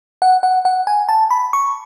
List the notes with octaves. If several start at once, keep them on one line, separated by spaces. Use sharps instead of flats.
F#5
F#5
F#5
G#5
A5
B5
C#6